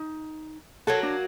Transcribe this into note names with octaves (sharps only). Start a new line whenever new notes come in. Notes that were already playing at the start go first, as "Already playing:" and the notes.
Already playing: D#4
F#3 A#3 F#4 A4
D4